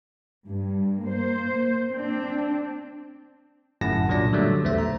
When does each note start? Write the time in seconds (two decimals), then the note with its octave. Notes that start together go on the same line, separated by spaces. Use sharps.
0.48 G2
1.03 A#3 C5
1.91 C4 D4
3.81 G1 F#2 A2 F#5 A5 A#6
4.08 C2 A#2 F#3 D4 D5 A#6
4.33 D3 F#3 G3 A3
4.63 B1 E2 A3 C5 E5
4.78 A#5